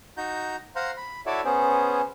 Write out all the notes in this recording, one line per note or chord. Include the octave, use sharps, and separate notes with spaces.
D#4 F#4 A#5 G6
C5 F5 F#5 A#5 C6
B5
E4 F#4 A4 C#5 D5 E5
B3 C#4 G#4 C5